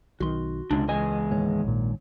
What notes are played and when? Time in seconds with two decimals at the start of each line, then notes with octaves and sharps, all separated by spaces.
0.20 B1 D#3 F#4 C6
0.71 C#2 C3 G#3 D4
0.89 E2 G#3 D#5 G#5
1.31 D#2 G#2 C#5
1.65 A#1 A#2